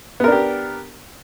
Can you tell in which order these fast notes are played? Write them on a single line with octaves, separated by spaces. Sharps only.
B3 A#4 D4 G4